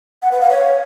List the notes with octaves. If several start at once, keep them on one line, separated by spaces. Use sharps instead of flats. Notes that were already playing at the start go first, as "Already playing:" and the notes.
F#5
B4
F5
C#5